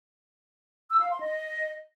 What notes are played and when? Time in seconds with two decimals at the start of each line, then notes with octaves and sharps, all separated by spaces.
0.90 E6
1.00 F5
1.10 C6
1.21 D#5